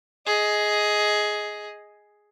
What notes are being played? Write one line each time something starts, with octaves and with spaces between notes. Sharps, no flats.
G#4 D#5